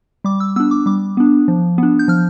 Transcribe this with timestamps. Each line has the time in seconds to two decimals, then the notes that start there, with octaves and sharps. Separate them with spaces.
0.24 G3 D6
0.40 E6
0.56 B3 D4 E6
0.71 D6
0.86 G3 D6
1.17 B3 D4
1.48 F3
1.78 B3 D4
1.99 G6
2.08 F3 F6